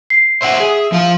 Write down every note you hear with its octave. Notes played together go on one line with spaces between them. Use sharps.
C7
C5 D5 E5 F#5
G#4
F3 F4 F5